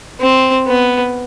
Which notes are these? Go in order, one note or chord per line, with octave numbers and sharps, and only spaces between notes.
C4
B3